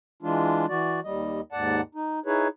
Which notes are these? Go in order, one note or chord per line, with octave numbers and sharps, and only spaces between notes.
E3 G#3 D4 F4
E3 F#4 D5
D#2 G3 D#5
D#2 G#2 D5 F#5 A5
D#4
D#4 E4 G#4 B4 C#5